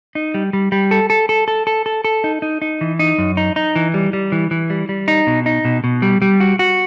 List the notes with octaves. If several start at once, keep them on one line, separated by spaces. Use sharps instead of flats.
D#4
G3
G3
G3
A4
A4
A4
A4
A4
A4
A4
D#4
D#4
D#4
E3
D#4
F#2
D#4
D#4
E3
G3
G3
E3
E3
G3
G3
D#4
B2
D#4
B2
B2
G3
G3
F#4
F#4